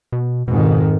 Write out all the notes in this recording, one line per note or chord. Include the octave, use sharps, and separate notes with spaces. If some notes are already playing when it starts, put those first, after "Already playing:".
B2
F2 G#2 B2 D#3